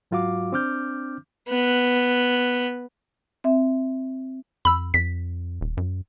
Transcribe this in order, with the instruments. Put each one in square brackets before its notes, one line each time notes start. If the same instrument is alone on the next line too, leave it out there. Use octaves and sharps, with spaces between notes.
[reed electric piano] G#2 F#3 F4 F#4 F5 D6
C4 D4 D6 F6 G6
[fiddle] B3 F#6
[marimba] C4 E5
[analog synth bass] F2 [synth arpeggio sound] B5 E6
[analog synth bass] F2 [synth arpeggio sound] B6
[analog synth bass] D#1
F#2